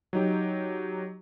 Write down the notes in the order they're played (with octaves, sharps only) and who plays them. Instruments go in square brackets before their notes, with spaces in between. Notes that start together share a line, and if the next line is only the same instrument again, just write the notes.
[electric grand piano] F#3 D#4 G4